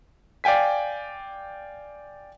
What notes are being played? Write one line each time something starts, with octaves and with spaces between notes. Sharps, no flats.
D5 F5 G5 G#5 B6